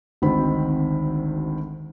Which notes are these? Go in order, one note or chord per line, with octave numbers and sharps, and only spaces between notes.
G#1 D2 D#3 C4 B5